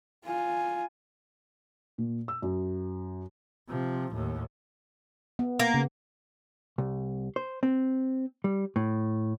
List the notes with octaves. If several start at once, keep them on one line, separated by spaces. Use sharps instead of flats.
F4 G#5
A#2
E6
F#2
C3 F3
D#2 A2
B3
A#3
C#3
C2
C5
C4
G3
A2